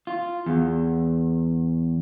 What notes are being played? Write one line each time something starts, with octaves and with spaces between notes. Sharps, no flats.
F4
E2